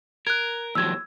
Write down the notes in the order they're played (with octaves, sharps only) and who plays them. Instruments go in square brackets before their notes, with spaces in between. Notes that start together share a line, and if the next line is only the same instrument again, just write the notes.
[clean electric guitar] A#4 [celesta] F#6 G#6
[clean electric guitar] D#2 F3 F#3 [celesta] E6 G#6